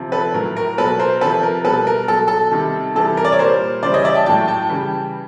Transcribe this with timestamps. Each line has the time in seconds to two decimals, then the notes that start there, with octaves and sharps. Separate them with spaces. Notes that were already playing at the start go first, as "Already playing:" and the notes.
Already playing: C3 F3
0.12 A4 B4
0.34 A2 F#3 A#4
0.57 A#4
0.78 B2 F#3 A4 B4
0.99 A#4 C5
1.21 C3 F3 A4 B4
1.43 A#4
1.65 B2 G3 A4 B4
1.87 A#4
2.08 B2 F#3 A4
2.28 A4
2.51 C3 D#3 G3
2.95 C3 E3 G3 A4
3.17 A#4
3.25 D5
3.32 C#5
3.39 A#2 G3 A#4 C5
3.82 C#3 E3 G3 C5 D5
3.94 C#5 D#5
4.05 D5 E5
4.15 G5 A5
4.26 A2 F#3 G5 A5
4.48 G5 A5
4.69 C#3 E3 G3